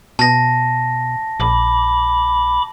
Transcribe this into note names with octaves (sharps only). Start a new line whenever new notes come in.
B2 A5 A#6
A#1 B5 D6